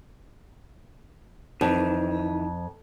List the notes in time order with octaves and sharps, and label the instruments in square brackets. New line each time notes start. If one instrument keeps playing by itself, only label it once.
[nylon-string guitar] F2 [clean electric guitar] D#3 E3